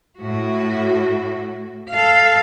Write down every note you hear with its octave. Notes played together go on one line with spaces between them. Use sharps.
A2 F#4
A4 F5